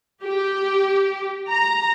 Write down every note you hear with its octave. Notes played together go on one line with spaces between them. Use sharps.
G4
A#5